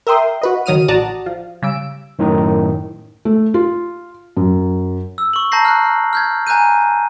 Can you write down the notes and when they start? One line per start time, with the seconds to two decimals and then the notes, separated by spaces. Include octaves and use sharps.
0.07 A#4 E5 G5 C6 D#6
0.42 F#4 B4 D#5
0.66 G1 D#3 F#3 D#6 F6 D#7
0.88 A1 F#4 D5 A5 A#5 D#6
1.26 F3
1.62 C#3 G3 E6 D7
2.19 F#2 A2 D#3 D#4
3.25 A3
3.54 F4
4.37 F#2
5.18 E6
5.33 C#6 F#7
5.52 A5 A#5 G6 A#6 C7
5.65 F6 F#6
6.13 F6 G6 G#6
6.47 G#5 A#5 F#6 G6 D#7